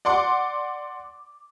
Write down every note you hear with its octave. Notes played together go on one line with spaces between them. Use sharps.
D5 F#5 C6 D6